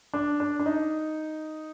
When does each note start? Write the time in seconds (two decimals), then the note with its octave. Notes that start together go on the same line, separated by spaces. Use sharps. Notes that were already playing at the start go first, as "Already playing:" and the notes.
0.13 D4
0.40 D4
0.59 D4
0.66 D#4